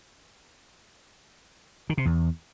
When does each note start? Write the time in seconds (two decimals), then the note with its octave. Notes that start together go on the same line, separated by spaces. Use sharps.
1.90 D#3
1.98 C3
2.05 E2